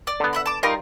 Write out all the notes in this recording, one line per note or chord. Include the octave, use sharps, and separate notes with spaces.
D5
D3 B3
E5 F#5 B5
A5 D6
G3 D#4 F4 A#4